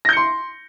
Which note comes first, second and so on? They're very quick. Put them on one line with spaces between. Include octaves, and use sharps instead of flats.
A#6 G6 C#7 C6